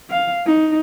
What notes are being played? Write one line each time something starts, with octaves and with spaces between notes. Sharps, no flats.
F5
D#4